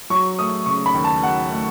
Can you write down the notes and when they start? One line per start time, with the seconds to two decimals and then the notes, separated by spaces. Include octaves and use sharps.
0.10 F#3 C#6
0.39 A3 D#6
0.66 C#3 C#6
0.86 B5
0.94 D#2
1.04 A5
1.23 F#3 F#5
1.51 A3